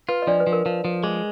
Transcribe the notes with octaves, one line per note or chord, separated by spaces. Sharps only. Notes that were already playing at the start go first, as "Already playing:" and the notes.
F4 B4
D#5
F3 D4 D5
B4
F3
A#4
F3
F3
G#3 G#4